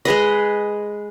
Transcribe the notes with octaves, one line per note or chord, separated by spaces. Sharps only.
G#3 G#4 B4 D#5